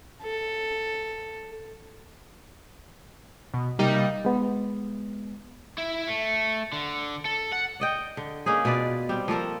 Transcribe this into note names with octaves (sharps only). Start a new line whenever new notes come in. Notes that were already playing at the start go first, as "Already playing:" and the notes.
A4
B2
C3 G3 A#3 D#4
G#3 B3
E4
A3
D3
A4
F#5
D5 D#5 G5
D3
A#3 C#4 D#4 G#4
B2 F4 B4 D5
G3 C4
F3 A#3 A4 A#4